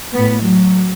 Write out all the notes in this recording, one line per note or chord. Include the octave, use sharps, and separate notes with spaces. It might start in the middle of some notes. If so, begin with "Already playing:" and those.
A2 B3
F#3